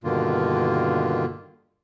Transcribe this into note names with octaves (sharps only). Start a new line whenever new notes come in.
G2 B2 D3 D#3 A#3 F4